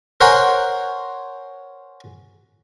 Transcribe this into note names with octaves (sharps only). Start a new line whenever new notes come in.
A#4 C5 C#5 F#5 G#5 C6